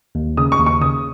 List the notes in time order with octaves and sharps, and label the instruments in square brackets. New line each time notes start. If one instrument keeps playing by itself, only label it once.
[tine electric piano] D#2
[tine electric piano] C#3 [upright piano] D#6
[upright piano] C#6
[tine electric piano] D#2
[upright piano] C#6
[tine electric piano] C#3 [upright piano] D#6